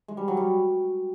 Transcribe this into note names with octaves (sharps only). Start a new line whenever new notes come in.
G#3
G3
F#3
G3